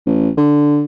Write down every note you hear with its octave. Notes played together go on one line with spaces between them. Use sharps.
A1
D3